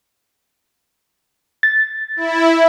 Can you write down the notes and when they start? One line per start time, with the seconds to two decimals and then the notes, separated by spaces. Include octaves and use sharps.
1.63 A6
2.17 E4